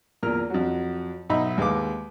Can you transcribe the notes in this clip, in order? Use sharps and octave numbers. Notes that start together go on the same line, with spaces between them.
E2 A#2 A#4 F6
F2 F#3
B1 D#4 D#5 E5 B5
D#2 G#3 B4 F5 D6